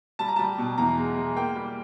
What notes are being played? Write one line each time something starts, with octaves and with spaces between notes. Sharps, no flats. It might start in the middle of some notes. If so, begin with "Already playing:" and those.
G3 A5
A#5
G3 A5
B2
E2 A#5
G#3
G#3
A#3 G5
G3